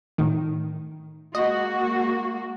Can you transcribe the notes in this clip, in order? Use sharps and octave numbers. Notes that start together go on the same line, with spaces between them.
A2 D#3
G#3 A#3 F#4 D#5